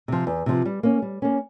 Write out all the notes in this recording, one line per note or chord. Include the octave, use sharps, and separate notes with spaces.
C3 F3
E2
C3 F3
G3
A#3 C#4
G3
A#3 C#4